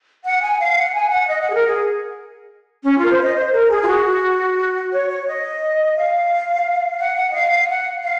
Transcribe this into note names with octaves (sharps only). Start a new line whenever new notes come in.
F#5
G#5
F5
F#5
G#5
F#5
D#5
F#5
G#4
A#4
G#4
C#4
F4
A#4
C5
D#5
C5
A#4
G#4
F4
F#4
C#5
C#5
D#5
F5
F#5
F#5
D#5
F5
F5
F#5
F5